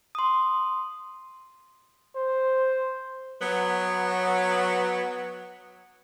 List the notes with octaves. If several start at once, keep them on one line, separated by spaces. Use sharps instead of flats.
C6 D#6
C5
F#3 B3